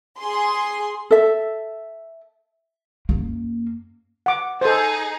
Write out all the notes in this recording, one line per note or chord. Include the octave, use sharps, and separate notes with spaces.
G#4 C6
A4 E5
F#2 A#3
F#5 D6
D#4 G#4 A4 C5